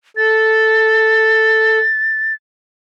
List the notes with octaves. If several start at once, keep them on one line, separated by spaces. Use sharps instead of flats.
A4 A6